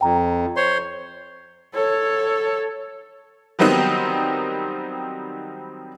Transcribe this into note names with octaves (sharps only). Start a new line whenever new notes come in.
F2 G5 A#5
C5 C#5 C6
A4 C#5
D#3 F#3 G3 B3 C4 D#4